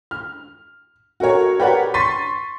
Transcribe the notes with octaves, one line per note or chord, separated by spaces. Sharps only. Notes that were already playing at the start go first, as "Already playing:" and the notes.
F6
F#4 A4 A#4 C#5
G4 A#4 B4 C#5 D5 F#5
C6 C#6 A6 B6 D#7